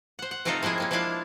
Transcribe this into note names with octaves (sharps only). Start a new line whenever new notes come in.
C5 F#5
F#5
C3 A3 C4 D#4 F4 A4
F3 G#3 A#3 E4 G#4
C3 A#3 C#4
F3 G#3 D4 E4 F4 F5